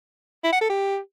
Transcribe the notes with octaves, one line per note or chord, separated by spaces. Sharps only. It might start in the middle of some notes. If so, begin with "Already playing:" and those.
E4
F#5
A4
G4